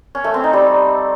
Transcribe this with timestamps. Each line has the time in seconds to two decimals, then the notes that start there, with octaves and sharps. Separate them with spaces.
0.15 C#4
0.24 A3
0.34 C4
0.44 D#4
0.53 G3